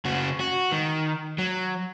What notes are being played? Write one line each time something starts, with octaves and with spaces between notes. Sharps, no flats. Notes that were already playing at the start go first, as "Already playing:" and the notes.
C#3 F#4
F#4
D#3
F#3